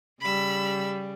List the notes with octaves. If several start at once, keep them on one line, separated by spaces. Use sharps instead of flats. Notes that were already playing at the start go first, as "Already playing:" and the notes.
C#3 G3 B5 E6